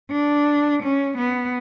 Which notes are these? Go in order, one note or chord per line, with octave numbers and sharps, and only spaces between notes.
D4
C#4
B3